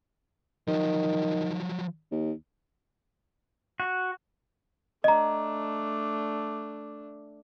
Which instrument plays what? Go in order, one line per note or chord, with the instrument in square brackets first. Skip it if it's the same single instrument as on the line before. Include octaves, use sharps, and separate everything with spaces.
[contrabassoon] D#3 [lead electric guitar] F3 F#3
[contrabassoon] D#2
[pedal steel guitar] F#4
[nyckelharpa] A3 D4 [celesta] D#5 A#5